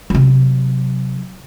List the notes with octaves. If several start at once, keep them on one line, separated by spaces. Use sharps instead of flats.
C3 F#3